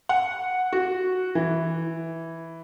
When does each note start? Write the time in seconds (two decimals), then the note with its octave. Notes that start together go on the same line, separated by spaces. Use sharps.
0.09 F#5
0.73 F#4
1.35 E3